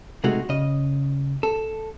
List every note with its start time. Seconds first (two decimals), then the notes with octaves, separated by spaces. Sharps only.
0.24 C3 G#3 A3 D#4 F#4 G#4
0.49 C#3 D#5
1.43 A4